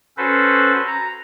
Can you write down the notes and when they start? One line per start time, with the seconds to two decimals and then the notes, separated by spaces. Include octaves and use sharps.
0.17 C#4 F#4 A4 B4 C5
0.87 A#5